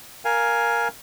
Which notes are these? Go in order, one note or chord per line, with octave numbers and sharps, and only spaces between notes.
A#4 F5 G#5